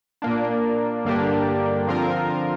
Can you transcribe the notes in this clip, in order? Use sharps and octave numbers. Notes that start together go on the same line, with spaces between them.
A#2 A#3 D4
G2 D3 A#3 D4 G4
D3 F3 C4 F4 A#4